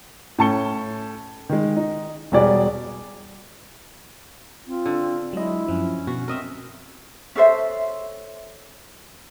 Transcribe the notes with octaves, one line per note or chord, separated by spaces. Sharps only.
A2 C#4 A5 C#6 C#7 G7
D#3 G#3
D#4
E1 B2 G3 F#4 G#4 D5
C4 F4
D3
F#3 G#3 E4 D#5
F#2 F3 C#4
B2 F#4
C4 A#4 D#5 E5
C#4 A4 C5 E5